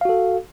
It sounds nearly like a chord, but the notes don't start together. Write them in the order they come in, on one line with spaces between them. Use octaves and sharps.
F5 F#4 A4